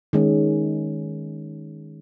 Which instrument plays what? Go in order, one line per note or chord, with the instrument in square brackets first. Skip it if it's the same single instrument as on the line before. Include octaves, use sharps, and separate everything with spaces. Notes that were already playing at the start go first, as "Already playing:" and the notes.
[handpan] D#3 G#3 C#4